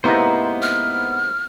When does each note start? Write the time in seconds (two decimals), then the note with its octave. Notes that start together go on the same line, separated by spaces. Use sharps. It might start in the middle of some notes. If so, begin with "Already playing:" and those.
0.04 G#2 C3 A#3 B3 D#4 E4 B4 C5
0.62 F6